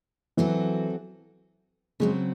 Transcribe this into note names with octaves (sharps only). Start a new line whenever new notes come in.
E3 F#3 C4 F#4 A4
C#3 F#3 G#3 C4